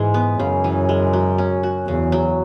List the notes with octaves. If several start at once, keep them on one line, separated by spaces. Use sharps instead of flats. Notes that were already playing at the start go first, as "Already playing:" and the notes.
Already playing: G#2 E3 G#3
B3
F#2 C#3
E3
G#3
F#3
C#4
F#4
E2 C#3
F#3